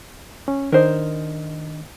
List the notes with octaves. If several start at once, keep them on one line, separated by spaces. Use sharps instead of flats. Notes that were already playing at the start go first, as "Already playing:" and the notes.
C#4
D#3 D4 A#4 C5 D#5